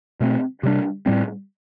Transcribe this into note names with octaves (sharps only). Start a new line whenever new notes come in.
B2 A3 C4
C3 G3 D4
A2 G3 C4